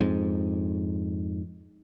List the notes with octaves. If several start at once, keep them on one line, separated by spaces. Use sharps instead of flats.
F2 G#2